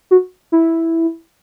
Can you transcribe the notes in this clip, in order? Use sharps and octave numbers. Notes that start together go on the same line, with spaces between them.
F#4
E4